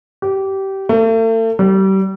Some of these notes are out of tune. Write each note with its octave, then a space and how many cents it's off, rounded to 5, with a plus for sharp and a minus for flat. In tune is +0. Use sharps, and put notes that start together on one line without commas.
G4 -20
A3 +40
G3 -30